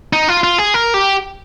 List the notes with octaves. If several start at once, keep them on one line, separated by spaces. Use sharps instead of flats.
D#4
F4
F4
G#4
A#4
G4